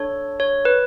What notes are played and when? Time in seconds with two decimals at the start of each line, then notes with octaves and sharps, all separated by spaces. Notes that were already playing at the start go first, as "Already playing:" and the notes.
Already playing: D4 A4 C#5
0.40 C#5
0.65 B4